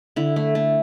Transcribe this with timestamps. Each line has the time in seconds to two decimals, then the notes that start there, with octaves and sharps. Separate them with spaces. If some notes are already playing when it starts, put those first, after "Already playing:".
0.16 D3 E4
0.36 A3
0.55 A3